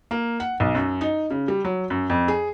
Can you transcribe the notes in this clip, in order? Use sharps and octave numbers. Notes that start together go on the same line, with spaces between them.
A#3
F#5
B1
F#2
D#4
C#3
G3
F#3
F#2
F2
G#4